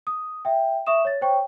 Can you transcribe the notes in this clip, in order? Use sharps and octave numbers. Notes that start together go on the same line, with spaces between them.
D#6
E5 G5
E5 C#6 D#6 E7
C#5 A6
C5 C#5 G5 C#6